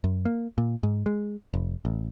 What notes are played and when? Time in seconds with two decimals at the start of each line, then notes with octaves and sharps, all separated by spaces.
0.04 F#2
0.25 A#3
0.58 A#2
0.83 G#2
1.06 G#3
1.54 F1
1.85 A1